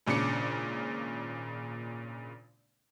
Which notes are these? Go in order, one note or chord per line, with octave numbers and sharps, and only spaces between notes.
G#1 A#2 C#3 D4 C#7